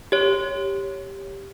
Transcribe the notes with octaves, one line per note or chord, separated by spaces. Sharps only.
G4 C#5